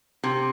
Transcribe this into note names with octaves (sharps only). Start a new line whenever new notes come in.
C3